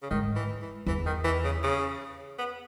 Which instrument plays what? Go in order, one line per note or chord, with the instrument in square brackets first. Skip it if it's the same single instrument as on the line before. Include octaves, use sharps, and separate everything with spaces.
[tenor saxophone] C#3
[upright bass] G#2 [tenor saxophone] D#3
[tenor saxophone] E3
E3
[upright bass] E2 [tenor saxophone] E3
[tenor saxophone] D#3
E3
C#3
C#3
B3